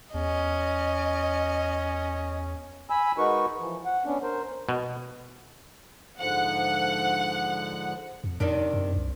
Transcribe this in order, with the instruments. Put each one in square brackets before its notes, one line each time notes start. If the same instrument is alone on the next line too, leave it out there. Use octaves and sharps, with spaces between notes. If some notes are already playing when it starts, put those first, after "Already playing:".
[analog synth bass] E2 [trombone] C#4 [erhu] D#5
[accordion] G#5 B5 E6
G#3 D#4 F#4 A#4 B4 C#6
E3 F3
F#5
B3 C#4 D4
A#4 C5
[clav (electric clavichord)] B2
[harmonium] G#2 D3 F3 [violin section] F#5
[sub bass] F2
[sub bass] F2 [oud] C3 D#3 D4
[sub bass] F#2
C2